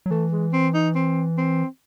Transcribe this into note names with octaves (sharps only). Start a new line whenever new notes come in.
F#3
E3 A3
G#3
C4
D#4
C4
C4